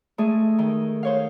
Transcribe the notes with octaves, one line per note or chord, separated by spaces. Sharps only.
G#3 A3 G#4
D#3
C5 C#5 F5